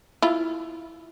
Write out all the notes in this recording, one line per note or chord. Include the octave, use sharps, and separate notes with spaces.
E4 F4